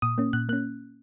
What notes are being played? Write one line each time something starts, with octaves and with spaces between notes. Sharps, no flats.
A#2 D#6
A#3 C#4
A#2 F#6
A#3 C#4 F#6